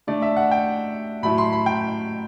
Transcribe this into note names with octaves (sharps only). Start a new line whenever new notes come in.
D3 A3 D4 D5
E5
F#5
G5
A2 F#3 A3 E4 B5
C6
B5
G5